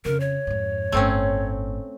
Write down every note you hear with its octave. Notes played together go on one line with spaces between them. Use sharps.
F2 C#3 A#4
C#5
F2 G#2
G1 A2 A3 C4 C#4